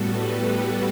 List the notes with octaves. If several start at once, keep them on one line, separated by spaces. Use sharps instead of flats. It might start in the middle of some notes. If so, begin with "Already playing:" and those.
Already playing: A2 G3 B3 F#4 A4
G4 B4